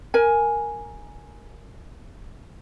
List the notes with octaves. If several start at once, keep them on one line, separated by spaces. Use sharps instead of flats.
A#4 G#5